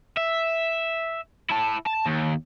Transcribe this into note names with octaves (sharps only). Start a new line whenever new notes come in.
E5
E4 A5
A5
D#2